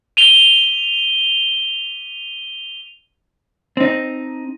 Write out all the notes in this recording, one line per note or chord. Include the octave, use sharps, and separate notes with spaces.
D#7 F7 G7
C4 D#4